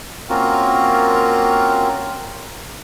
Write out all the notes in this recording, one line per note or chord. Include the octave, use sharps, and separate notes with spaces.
A#3 C4 C#4 F4 F#4 A#4